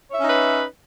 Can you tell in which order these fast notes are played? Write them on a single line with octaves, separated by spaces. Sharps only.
C#5 E5 C#4 D#4 B4